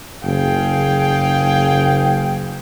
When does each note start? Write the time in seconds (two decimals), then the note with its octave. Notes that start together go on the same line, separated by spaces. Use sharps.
0.24 F#1 G#4 F5 G5